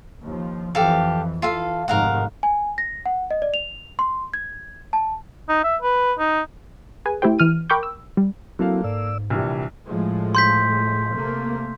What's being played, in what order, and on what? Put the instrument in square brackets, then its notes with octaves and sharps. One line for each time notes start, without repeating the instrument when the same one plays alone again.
[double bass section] D#2 F3
[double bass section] F2 E3 [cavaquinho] G4 A4 F5
[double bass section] E3 [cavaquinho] F4 A4 F5
[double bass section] F1 G#2 D#3 [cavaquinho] A#4 F5 F#5
[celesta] G#5
A#6
F#5
D#5
D5
F7
C6
G#6
A5
[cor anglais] D#4
E5
B4
D#4
[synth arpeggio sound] G#4 B4 G#5
A3 E4 G4 C5 G5
E3 F6 D#7
A#4 G5 B5 C#6 D6 G6
E6
G3
[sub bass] F#3 [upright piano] A#3 A4 F5 [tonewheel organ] C4 E4 F#4
[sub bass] G#2 [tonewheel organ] D5 E6
[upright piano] A#1 E3 G3 [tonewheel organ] C3
[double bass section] A2 F3 G#3
[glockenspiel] C6 G6 B6
[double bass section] C3 A3 A#3